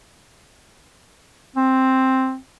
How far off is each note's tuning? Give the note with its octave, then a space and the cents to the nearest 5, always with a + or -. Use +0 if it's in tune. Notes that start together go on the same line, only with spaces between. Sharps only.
C4 +5